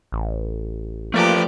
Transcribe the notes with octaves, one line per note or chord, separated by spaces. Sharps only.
A1
F3 A3 A#3 G4 A4 B4 D5